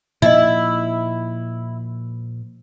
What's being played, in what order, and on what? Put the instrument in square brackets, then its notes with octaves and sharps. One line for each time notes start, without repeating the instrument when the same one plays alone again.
[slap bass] A#2 F3 A#3 [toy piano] D#4 D#5 [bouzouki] E4